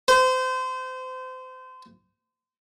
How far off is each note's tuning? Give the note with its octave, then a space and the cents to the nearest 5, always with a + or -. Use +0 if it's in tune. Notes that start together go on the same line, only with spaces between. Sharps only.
C5 -30